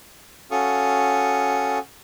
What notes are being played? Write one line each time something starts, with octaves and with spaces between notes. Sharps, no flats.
C#4 F#4 A4 F5 C#6 D#6